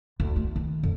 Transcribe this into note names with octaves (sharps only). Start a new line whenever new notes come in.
D2
A3
D#3
F2